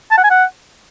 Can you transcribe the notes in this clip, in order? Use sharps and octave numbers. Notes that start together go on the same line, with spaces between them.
A5
F#5
G#5
F#5